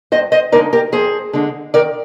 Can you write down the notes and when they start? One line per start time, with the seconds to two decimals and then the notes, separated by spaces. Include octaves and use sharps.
0.12 G2 C5 D#5
0.32 C5 D#5
0.52 D3 G#3 D#4 A#4 D5
0.73 G4 A#4
0.92 F2 G#4 C5
1.33 D3 G#3 D4
1.74 D#3 A#4 D5